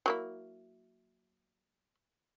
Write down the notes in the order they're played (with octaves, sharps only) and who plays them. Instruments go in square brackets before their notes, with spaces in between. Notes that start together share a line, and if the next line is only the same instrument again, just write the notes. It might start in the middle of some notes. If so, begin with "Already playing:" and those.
[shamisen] F#3 A#3 E4